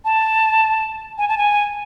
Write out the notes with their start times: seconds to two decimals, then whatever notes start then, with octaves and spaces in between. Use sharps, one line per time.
0.05 A5
1.18 G#5
1.29 A5
1.37 G#5